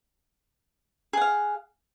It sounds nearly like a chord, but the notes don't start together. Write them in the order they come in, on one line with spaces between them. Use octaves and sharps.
G#4 F#5 F5